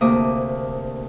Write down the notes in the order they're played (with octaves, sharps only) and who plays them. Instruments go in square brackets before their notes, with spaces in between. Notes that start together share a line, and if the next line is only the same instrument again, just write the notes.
[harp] D2 C3 A#3 D6 D#6